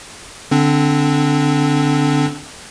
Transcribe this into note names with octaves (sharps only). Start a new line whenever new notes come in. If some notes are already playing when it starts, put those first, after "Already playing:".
D3 C4 D4